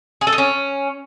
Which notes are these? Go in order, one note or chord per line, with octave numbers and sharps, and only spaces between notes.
G#4
A4
D#4
C#4